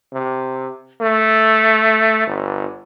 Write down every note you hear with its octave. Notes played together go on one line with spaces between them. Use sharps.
C3
A3
G1